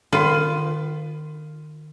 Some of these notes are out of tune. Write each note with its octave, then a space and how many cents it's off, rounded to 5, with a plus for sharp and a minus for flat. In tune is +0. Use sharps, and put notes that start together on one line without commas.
D#3 -30 F4 +0 B4 +25